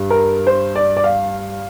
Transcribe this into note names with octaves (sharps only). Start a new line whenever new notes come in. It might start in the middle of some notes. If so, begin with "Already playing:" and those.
Already playing: G2
A#4
C5
D5
D5
F5